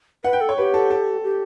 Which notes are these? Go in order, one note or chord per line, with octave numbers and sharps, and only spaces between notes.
B4 F#5
G5
A4
C#5
G4 B4
A4
A4
G4